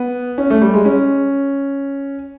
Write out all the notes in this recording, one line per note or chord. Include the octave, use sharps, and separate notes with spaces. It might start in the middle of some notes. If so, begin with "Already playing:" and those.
Already playing: B3
C#4
A3
G3
G#3
C#4